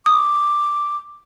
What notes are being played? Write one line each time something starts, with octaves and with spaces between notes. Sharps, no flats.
D6 D#6